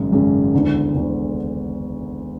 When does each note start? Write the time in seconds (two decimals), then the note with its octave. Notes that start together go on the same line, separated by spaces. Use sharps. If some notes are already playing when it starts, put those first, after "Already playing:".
Already playing: G#1 F#2 C#3 G#3
0.12 G#1 F#2 C#3 G#3
0.54 E1 D2 D3
0.95 E1 D2 D3